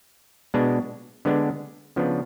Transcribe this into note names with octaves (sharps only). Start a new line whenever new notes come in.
B2 G#3 B3 D4
D3 G#3 B3 D4
C#3 F3 B3 D4